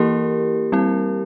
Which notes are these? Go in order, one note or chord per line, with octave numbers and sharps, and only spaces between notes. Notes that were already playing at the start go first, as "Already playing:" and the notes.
Already playing: E3 A#3 E4 G4 A#4
G3 C4 E4